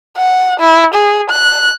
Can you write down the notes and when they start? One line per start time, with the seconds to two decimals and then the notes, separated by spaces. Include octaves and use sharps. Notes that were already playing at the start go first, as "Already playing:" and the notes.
0.17 F#5
0.60 E4
0.94 G#4
1.30 F#6